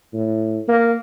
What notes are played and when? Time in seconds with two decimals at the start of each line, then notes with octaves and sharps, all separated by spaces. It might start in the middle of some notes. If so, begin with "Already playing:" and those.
0.14 A2
0.68 A#3